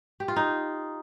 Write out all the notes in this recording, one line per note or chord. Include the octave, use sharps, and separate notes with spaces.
G4
F4
D#4